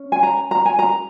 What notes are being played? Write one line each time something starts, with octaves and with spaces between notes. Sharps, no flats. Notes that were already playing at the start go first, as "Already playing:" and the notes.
Already playing: C#4
G#5
A#5
A#5
G#5
A#5